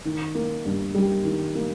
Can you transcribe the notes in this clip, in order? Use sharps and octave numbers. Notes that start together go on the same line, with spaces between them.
D#3
A#3
G2
G3
D#3
A#3